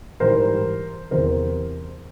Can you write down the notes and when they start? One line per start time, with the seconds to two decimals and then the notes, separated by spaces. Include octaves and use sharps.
0.20 G#2 E3 G3 A#4 C5
1.11 E2 C3 E3 A#4 C5